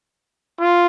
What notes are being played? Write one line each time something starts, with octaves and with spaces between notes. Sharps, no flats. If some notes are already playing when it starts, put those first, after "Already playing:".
F4